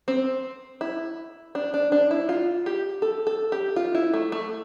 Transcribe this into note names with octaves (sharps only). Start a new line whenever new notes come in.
C4
E4
D4
D4
D4
E4
F4
G4
A4
A4
G4
F4
E4
A3
A3